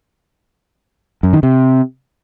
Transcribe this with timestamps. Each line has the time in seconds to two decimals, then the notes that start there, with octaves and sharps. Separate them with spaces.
1.23 F#2
1.33 D#3
1.43 C3